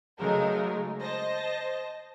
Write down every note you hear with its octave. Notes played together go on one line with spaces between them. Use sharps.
C#3 F#3 G#3 A3 D#4 A#4
C5 D#5 A5 A#6